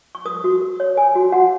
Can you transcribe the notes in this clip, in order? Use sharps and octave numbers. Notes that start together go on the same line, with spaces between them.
C#6
A#4 D#6
F#4
A#4
C#5
A#4 G#5
F#4
F#4 F#5